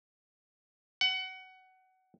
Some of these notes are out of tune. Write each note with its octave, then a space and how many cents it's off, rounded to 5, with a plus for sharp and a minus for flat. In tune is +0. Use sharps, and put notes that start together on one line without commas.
F#5 +20